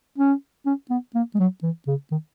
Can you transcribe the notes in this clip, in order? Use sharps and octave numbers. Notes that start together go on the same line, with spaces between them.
C#4
C#4
B3
A#3
G#3
F#3
E3
C#3
D#3